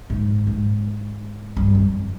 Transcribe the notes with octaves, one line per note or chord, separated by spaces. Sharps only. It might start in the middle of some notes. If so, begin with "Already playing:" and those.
G#2
G#2
G2
F2